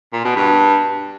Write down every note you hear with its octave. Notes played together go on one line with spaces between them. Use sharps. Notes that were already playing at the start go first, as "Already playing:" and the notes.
A#2
B2
G2